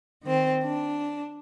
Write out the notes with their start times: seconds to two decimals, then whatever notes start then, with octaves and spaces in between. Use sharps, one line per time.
0.22 D#3 C4
0.63 D4